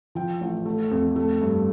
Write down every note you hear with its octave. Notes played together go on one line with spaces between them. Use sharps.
F3 G5
A1
A3
F2
A3
G2